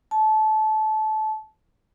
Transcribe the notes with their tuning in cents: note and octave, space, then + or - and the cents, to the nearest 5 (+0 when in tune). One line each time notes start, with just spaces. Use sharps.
A5 -20